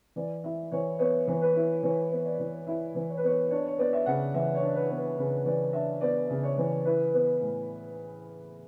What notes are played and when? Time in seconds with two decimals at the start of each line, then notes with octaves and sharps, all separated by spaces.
0.16 E3 D5
0.44 E4 E5
0.71 E3 C#5
0.99 B3 C#5
1.27 E3
1.42 B4
1.55 E4
1.83 E3 C#5
2.11 B3
2.25 D5
2.39 E3
2.67 E4 E5
2.95 E3
3.09 C#5
3.17 B4
3.23 B3 C#5
3.51 D4 C#5
3.66 C#5
3.78 B3 D5
3.93 E5
4.06 C#3 F#5
4.34 E3 E5
4.55 C#5
4.62 D4
4.75 B4
4.90 B3
4.97 B4
5.17 C#3 B4
5.45 E3 D5
5.73 D4 E5
6.01 B3 D5
6.29 C#3
6.43 C#5
6.57 E3
6.85 E4 B4
7.13 B3
7.41 A2